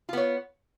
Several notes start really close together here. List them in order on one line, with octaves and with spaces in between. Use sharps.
F4 B3 C#5